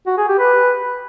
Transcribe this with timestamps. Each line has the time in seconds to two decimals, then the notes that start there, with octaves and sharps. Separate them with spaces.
0.07 F#4
0.17 G#4
0.28 G4
0.39 B4